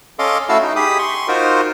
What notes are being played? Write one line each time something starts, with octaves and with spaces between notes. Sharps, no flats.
C#4 A4 D#5 F5 C6 D6
A3 E4 F#4 F5 A5 E6
D#4
G4 G#4 B5 D#6
C6 C#6
D#4 F4 F#4 A#4 C5